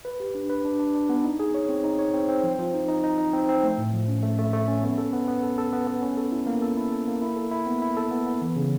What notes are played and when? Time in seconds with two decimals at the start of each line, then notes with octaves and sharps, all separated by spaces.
0.05 B4
0.20 G4
0.35 D4
0.50 B4
0.65 D4
0.79 D4
0.95 D4
1.09 B3
1.24 D#4
1.39 G#4
1.54 C#5
1.69 C4
1.84 D#4
1.99 C#5
2.14 C4
2.29 C4
2.43 F3
2.59 F3
2.74 D#4
2.88 D#4
3.04 D#4
3.18 D#4
3.33 C4
3.49 C4
3.63 A3
3.78 A2
3.93 F3
4.08 C#4
4.23 A3
4.38 A3
4.53 A3
4.68 C#4
4.83 B3
4.98 A4
5.13 B3
5.28 B3
5.43 A4
5.58 A4
5.73 B3
5.87 B3
6.02 C#4
6.17 A4
6.32 E4
6.47 A#3
6.62 A4
6.77 E4
6.92 A4
7.08 A#3
7.22 E4
7.36 A4
7.51 E4
7.67 B3
7.82 E4
7.97 A4
8.11 B3
8.26 B3
8.42 E3
8.56 C#3